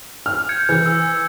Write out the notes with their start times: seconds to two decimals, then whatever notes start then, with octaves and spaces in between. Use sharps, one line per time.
0.26 F6
0.49 G6 G#6 C#7
0.69 E3
0.86 E6